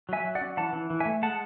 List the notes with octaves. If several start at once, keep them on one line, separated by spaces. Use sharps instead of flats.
F#3 E5 G#5
F#3
D5 F#5
C#4
E3 F#5 A5
E3
E3
A3 E5 G#5
G#3 F#5 A5